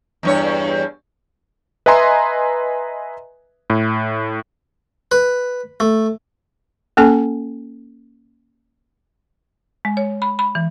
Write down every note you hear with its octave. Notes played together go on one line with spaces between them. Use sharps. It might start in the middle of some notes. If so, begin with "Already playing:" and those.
E2 G2 C#5
B4 D#5 E5 G#5 A#5 C6
A2
B4
A3
A#3 C#4 A4 G#5
G#3
C#5
B5
B5
E3